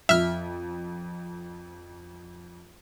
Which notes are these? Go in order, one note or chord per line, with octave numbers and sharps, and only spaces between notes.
F2 E5 F6